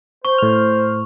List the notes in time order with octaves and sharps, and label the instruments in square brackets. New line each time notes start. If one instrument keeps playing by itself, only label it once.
[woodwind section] C5 [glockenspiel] C#6
[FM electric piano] A2 F6